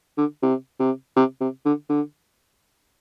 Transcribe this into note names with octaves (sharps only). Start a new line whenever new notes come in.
D3
C3
C3
C3
C3
D3
D3